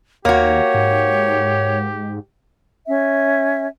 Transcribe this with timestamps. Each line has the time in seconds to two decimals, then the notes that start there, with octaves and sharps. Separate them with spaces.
0.25 D#2 A#3 F#4 G4 C#5
0.74 G#2
2.86 C#4 E5